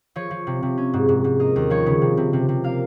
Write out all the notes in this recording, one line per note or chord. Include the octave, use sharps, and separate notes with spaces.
F3 C#5
F3
C3
C3
C#4
G#2
G#2
G#2
A#3 D#5
D#2
F3 C#5
C#3
C3
C3
C3
C3
A#3 F5